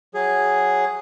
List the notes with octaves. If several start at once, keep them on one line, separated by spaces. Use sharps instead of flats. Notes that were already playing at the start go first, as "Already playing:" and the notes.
F#3 G#4